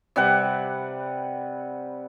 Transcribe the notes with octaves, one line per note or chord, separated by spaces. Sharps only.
C3 G3 B4 F#5